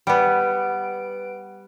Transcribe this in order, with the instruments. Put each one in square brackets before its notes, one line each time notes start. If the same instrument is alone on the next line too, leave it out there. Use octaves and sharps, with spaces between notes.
[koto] G3 B3 [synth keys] B4 F#5 D7